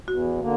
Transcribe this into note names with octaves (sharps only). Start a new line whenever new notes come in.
E2 F#4
D3 A#3